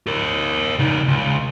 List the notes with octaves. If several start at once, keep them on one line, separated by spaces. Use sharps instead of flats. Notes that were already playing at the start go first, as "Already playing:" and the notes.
G4 A#4
C#3 D#4
C#2